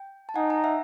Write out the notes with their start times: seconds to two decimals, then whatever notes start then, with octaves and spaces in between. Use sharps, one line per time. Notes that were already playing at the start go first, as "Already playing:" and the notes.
Already playing: G5
0.29 A5
0.36 D#4 F#5 G#5
0.50 G#5 A#5
0.64 E5 F#5